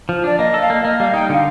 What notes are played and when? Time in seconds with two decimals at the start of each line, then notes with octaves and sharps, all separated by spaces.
0.09 F3
0.24 D4 D5
0.39 A#3 D#5
0.54 A4
0.62 F5
0.70 A#3
0.84 A#3 D#5
0.99 G3 F5
1.14 D#4 G5
1.29 D3 G5
1.35 F5